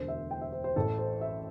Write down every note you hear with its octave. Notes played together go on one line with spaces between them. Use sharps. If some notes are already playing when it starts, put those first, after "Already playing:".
Already playing: E1 D2 D3 C5
E5
G5
E5
C5
C5
A1 A2 E3 A4
C5
E5